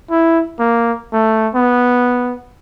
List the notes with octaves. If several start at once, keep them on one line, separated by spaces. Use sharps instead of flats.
E4
A#3
A3
B3